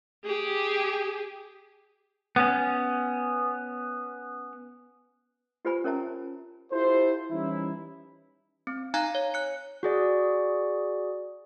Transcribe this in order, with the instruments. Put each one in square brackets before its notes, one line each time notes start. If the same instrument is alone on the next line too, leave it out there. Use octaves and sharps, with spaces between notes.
[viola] G4 G#4
[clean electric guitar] B3 C#4
[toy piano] F4 G4 B4 C5 G#5 B5
C#4 A#4 C#5 E5 A5 A#5
[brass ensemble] E4 F4 G4 A4 C5
E3 G3 C#4 D#4 E4
[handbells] C4
D#4 F5 G#5 A#5 F#6 G#6
C#5
F#6 C#7
F#4 G#4 D5